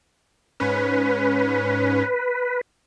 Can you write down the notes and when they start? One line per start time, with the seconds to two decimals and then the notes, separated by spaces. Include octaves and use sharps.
0.60 G#2 C#4 B4